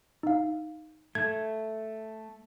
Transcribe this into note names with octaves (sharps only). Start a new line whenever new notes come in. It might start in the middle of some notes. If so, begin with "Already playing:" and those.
D#4 F5
A3 G#6